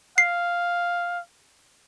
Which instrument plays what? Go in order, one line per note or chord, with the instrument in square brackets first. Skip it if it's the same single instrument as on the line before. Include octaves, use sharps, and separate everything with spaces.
[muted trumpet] F5 [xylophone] C7